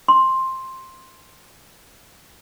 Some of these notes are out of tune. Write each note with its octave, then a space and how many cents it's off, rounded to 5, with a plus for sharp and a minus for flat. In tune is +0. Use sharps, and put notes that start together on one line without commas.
C6 +10